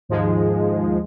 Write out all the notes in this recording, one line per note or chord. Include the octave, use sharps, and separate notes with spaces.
D#2 G#2 F3 G#3